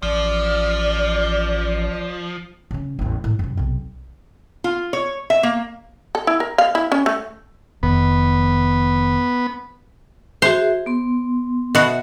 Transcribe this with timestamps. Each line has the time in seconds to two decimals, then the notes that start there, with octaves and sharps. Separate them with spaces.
0.02 A1 F3 D5
2.71 C#3 C#4
2.99 A1 E2
3.24 A2
3.39 F#2 C3
3.57 B1 C3
4.64 F4
4.93 C#5
5.30 E5
5.43 A#3
6.15 A4
6.27 E4
6.40 A#4
6.58 F5
6.75 E4
6.92 C#4
7.06 A3
7.83 F1 F2 D#3 B3
10.42 F#4 G#4 C5 E5
10.86 B3 C6
11.75 B2 F#4 E5